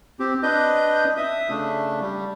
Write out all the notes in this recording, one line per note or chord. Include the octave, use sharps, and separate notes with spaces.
C4 G4
D4 B4 D#5 G6
E5 D#6
C#3 A3 D4
G3